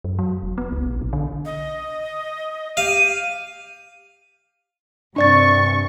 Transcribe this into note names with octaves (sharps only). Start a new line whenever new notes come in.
F#2
F#3
F1
B3
C#2
A#1
B1
D3
D#5
G4 F5 D#7
G2 C3 D4 D5 C#6 A6